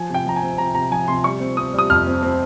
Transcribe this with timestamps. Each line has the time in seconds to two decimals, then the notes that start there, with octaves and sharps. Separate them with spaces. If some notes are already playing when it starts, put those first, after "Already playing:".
Already playing: F3 G#5
0.09 C3
0.14 G5
0.26 F3 A#5
0.36 G#5
0.42 C4
0.58 C3 A#5
0.75 C3 A#5
0.91 F3 G#5
1.08 C3 C6
1.24 G3 C#6
1.40 C4
1.57 C4 D#6
1.74 G3 D#6
1.90 F2 F6
2.07 C4
2.23 C4